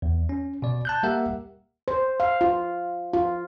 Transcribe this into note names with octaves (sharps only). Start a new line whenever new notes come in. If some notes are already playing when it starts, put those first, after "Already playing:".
E2
C#4
B2 D5
A5 F#6 G6
G3 A#3 G4 A#4 E5 F#5
C5
F5
F4
F4